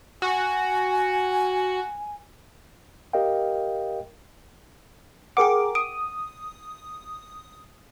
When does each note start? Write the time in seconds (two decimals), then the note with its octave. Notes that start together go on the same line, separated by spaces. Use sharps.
0.22 F#4 G#5
3.13 G4 A#4 D#5 F5 G5
5.37 G#4 A#4 F#5 G5 D6
5.75 D#6 D7